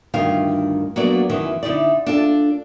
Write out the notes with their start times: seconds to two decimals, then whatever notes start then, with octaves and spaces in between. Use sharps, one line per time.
0.14 D2 G2 D#3 F4 F5
0.96 F#3 A#3 B3 D4 D5
1.29 F#2 D#3 E3
1.63 D3 D#4 E4 D5
2.07 D4 F4 A4